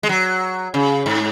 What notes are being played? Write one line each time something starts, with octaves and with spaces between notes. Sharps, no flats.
G#3
F#3
C#3
G#2